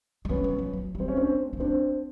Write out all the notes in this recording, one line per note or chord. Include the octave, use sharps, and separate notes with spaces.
G#3
G3 B3 C#4
F3
F#3
F3
F#3
G3
C4
C#4
A3 C4 D4
A#3
B3 C4 D4